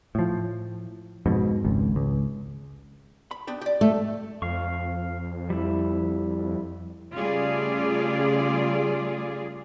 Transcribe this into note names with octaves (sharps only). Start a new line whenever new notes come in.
A2 F3
F2 G#2 B2
G#1 C#2
C#2
B5
B3 D4 G4
G4 D5
A3
F2 F5 C#6
G3 E4
C#3 G3 A3 F4 G#4 D5